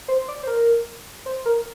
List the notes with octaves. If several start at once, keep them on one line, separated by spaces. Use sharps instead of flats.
C5
D5
C5
A#4
C5
A#4